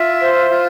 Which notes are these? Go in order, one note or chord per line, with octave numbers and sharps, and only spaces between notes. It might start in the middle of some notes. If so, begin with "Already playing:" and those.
Already playing: F4 E5
C5
F4